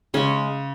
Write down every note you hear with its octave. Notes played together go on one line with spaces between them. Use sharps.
C#3 G#3 C#4 C#5